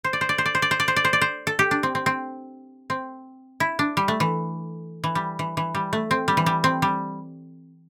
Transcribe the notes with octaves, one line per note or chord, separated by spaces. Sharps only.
C5
D5
C5
D5
C5
D5
C5
D5
C5
D5
C5
D5
C5
D5
C5
A4
G4
D4
C4
C4
C4
C4
E4
D4
G3
A3
E3
E3
G3
E3
E3
G3
A3
C4
G3
E3
G3
C4
G3